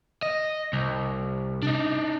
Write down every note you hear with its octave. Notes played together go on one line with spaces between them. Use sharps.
D#5
C2
D4 D#4